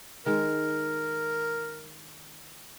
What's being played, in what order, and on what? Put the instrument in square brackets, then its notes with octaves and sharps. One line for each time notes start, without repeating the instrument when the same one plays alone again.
[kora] D#3 G#3 [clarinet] A#4